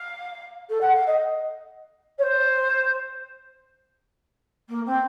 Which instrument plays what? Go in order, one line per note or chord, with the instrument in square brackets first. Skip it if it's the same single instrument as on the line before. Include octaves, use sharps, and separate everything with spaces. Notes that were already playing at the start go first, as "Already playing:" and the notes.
Already playing: [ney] F5
A4
F#5
F5
D#5
C#5
C5
A#3
C4